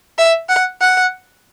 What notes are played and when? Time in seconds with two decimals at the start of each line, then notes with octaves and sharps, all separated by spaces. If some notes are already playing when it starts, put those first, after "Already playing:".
0.18 E5
0.49 F#5
0.81 F#5